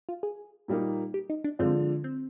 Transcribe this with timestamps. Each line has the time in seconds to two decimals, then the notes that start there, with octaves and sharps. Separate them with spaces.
0.09 F4
0.23 G#4
0.68 A#2 G3 A#3 D#4
1.14 G4
1.30 D#4
1.44 D4
1.59 D3 F3 G#3 C4 D4 F4
2.04 C4